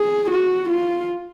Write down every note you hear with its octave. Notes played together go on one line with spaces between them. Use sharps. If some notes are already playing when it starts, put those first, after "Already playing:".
Already playing: G#4
F#4
F4